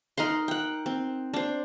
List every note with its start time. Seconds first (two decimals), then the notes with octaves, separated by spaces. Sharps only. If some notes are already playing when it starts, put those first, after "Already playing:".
0.18 D#4 A#4 F#5 C6
0.48 F#5 G5
0.86 C4
1.34 D4 C5